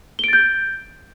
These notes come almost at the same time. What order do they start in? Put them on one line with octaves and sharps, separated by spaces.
G7 D7 A6 G6